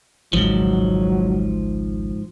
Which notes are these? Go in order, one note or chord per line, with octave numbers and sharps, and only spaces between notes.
G#1 C#2 G#2 F3 F#3